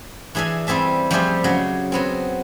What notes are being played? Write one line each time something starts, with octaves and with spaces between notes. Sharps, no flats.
E3 D4 G#4 E5 G#5
G3 C4 G#4 E5 A5
F3 G3 A3 G4 G#4 C5
C#3 F#3 G#4
F#3 B3 C4